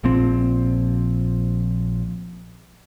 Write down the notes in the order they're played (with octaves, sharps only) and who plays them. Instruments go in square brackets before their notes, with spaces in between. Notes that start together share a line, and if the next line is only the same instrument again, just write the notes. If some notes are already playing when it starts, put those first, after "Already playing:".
[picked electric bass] A#1 A#2 F3 C4